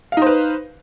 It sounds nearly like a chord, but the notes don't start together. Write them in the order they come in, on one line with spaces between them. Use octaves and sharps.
F5 D#4 C5 B4